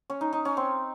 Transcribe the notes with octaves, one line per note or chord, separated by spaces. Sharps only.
C#4
D#4
D#4
C#4
C4